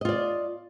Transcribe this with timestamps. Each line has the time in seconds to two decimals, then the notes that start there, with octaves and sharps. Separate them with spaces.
0.01 D#5
0.05 F4
0.09 D5